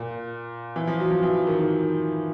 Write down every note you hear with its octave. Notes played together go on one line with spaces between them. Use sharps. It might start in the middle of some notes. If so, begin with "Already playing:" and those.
Already playing: A#2
E3
F3
F#3
F3
E3
D#3